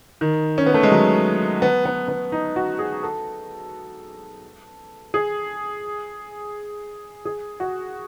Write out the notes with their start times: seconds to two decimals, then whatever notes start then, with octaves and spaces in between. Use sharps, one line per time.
0.21 D#3
0.58 C#4
0.66 B3
0.74 A3
0.83 G#3
0.91 F#3
1.62 B3
1.85 B3
2.08 B3
2.32 D#4
2.56 F#4
2.79 G#4
3.03 A4
5.14 G#4
7.25 G#4
7.60 F#4